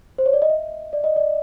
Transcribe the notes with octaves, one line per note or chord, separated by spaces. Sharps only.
C5
C#5
D5
D#5
E5
D5
D#5
D5